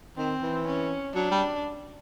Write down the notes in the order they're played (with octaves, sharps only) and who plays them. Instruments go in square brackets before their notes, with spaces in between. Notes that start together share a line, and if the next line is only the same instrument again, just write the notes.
[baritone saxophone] D#3 [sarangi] C4
[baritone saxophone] E3
[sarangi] C#4
[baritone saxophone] F#3 [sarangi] D4
[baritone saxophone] G3